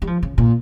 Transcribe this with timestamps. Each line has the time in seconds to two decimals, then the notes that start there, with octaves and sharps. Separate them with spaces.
0.02 G3
0.07 F3
0.23 C#3
0.38 A#2